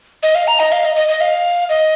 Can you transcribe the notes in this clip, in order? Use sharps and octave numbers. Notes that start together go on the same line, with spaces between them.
D#5
F5
A#5
D#5
F5
D#5
D#5
D#5
F5
D#5